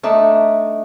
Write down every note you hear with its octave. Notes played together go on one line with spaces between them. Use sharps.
A3 D4 D#4